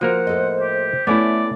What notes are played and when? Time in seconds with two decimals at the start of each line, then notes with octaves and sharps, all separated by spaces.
0.01 F3 A#3 F#4 A#4 C5 F#5
0.27 A2 A4 D#5
0.61 G4
1.07 A3 B3 C#4 E4 D5